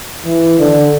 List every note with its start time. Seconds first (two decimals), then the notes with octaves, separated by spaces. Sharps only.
0.25 E3
0.59 D3